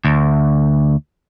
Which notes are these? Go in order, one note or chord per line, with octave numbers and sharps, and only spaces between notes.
D2